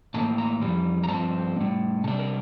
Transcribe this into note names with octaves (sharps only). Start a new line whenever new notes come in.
A2 E3 A#3 A5
A#5
F2 E3 G3
A#5
G2 F3 C4 A5
A2 G3 C4
C3 G3 D4 A5
A#4